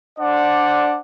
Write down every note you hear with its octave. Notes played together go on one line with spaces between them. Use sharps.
D4 C5 D5 F#5